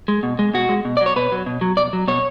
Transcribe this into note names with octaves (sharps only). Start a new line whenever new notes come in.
G#3
B2
G#3
B2 F#4
G#3
B2
F#3 D5
C#5
B2 B4
F#3
B2
F#3
B2 D5
F#3
B2 C#5